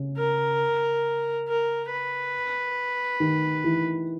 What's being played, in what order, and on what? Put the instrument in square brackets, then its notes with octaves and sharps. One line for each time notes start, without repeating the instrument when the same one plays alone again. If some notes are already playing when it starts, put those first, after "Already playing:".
Already playing: [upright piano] C#3
[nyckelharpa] A#4
A#4
B4
[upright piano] D#3
E3